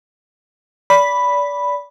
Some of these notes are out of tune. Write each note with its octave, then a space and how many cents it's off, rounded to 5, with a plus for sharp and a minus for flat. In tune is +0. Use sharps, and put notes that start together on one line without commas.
D5 -25 B5 +0